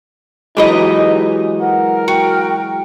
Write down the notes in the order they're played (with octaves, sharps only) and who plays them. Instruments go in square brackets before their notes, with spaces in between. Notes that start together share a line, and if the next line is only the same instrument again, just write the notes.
[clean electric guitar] E3 F#3 G#3 [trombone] D#4 [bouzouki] G4 B4 D#5
[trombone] A#4 [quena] F#5
[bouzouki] F#4 [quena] G5